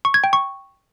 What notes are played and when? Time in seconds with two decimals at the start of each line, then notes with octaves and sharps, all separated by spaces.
0.05 C#6
0.14 G#6
0.24 G5
0.33 C#6